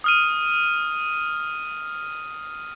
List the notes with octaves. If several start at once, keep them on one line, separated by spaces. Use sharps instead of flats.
D#6 F6 D#7